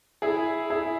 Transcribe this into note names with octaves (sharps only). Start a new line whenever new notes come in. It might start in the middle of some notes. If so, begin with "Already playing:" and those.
E4 G#4
E4 G#4